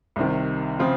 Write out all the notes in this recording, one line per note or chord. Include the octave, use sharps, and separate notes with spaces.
C2 C3 D#3
C#3 F3 C4 F4